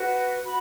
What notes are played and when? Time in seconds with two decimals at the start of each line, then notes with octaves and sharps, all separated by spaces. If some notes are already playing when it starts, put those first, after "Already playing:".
Already playing: F#4 B4
0.45 F#4 B5